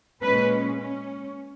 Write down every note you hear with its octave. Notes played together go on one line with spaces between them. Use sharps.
A#2 G#3 C#4 B4
C#4